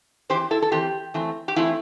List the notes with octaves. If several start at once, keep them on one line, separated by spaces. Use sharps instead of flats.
E3 C4 G4 C5
E4 A4
A4
E3 C4 G4
E3 A3 C4
G4
E3 A3 C4 E4